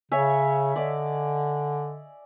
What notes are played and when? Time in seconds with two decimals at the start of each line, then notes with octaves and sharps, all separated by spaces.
0.12 C#3 C#5 E5 G#5
0.76 D3 D5 D#5